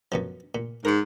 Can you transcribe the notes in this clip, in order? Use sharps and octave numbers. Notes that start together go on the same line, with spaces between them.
F#2 B2 F3
A#2
G#2 A#4 C#6